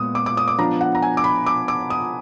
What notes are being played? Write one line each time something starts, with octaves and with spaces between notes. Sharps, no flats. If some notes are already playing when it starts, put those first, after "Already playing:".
Already playing: A#2 G#3 B3 D#6
D6
D6
D#6
D6
F3 B3 D4 F4 A#5
F#5
A#5
G#5
D6
B5
D6
D6
D#6